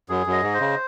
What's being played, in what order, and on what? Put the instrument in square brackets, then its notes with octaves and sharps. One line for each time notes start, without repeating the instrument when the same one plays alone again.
[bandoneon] F#2 [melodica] G#4
[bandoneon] F#2
[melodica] D#5
[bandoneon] G#2
[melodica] C5
[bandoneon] C#3